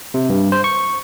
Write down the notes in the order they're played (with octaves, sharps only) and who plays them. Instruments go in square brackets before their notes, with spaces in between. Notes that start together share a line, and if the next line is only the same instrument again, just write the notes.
[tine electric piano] C3
G2
C5
C#6